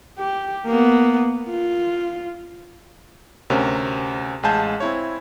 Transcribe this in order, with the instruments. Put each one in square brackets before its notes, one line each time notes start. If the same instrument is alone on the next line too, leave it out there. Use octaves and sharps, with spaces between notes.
[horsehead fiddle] G4
A#3 B3
F4
[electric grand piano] D2 C3 C#4 A#4
A1 G#3 F5 G#5 A5 G6
C4 E4 C#5